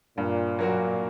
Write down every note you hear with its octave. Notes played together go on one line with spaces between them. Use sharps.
G2 A#2
F#3 A#3 F#4